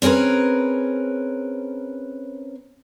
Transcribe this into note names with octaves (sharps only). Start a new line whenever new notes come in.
C4 C#4 G#4 A#4 B4